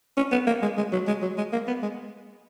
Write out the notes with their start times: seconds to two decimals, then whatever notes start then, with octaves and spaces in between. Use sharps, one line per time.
0.17 C#4
0.32 B3
0.47 A#3
0.62 G#3
0.77 G#3
0.93 F#3
1.07 G#3
1.22 F#3
1.38 G#3
1.53 A#3
1.67 B3
1.83 G#3